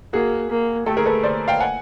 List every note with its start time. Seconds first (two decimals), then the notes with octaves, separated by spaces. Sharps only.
0.13 A#3 F#4 G#4
0.50 A#3
0.86 A3 G4 A4
0.97 G#4 A#4
1.06 A4 B4
1.23 C5 D5
1.48 F5 G5
1.60 F#5 G#5